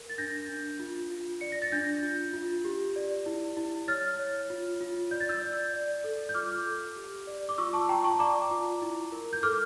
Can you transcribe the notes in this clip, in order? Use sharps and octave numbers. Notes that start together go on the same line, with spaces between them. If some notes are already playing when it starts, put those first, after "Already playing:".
Already playing: A#4
A6
D4 G6 A#6
D4
F4
F4
D5 C#7
A#6
A6
D4 G6 A#6
F4
F4
G4
D5
E4
E4
C#5 F6 A6
C#5
F4
F4
D5 G6
A6
E6 G6
D5
D5
A4
G6
F4 D6 F6
A4
G4
D5
D6
F4 C#6 E6
A5 C#6
C#6
F4 G5 A#5
A5 C#6
D5 A#5 D6
F4
E4
A#4
G6
A4 D6 F6